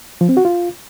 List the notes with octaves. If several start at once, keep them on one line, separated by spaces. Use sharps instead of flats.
F3
C4
F#4
F4